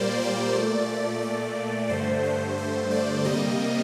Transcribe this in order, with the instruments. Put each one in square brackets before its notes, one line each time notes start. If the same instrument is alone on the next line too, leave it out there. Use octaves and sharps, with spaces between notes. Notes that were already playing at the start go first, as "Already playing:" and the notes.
Already playing: [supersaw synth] A#2 G3 A#3 C5 D5
D5
A#2 A3
D5
G2 D3 A3 C5
C5
C5
D5
C3 G3 A#3 D#5